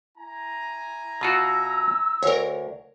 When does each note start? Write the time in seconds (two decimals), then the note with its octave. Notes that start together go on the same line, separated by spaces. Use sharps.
0.18 E4 G#5 A#5
1.21 B2 F4 F#4 E6
2.23 D2 A#4 C#5